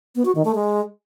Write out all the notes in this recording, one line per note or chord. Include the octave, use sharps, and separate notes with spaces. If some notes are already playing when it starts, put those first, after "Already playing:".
B3
F#4
D#3
A3
G#3